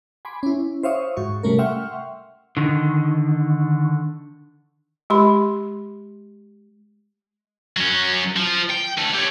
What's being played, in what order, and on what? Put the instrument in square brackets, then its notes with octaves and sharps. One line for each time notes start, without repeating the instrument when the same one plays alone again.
[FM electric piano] G#5 B5 C6 D6
C#4 E4
C5 C#5 E5 F5 C#6 D#6
G#2 F#4 C#6
C3 G3 A3 C#4 A#4
E5 F#5 G5 C6 C#6 F6
[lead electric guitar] D3 D#3
[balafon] G#3 G4 B5 C6
[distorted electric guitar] F#3 C#4
F3
G5
D2 A3
G4 C#5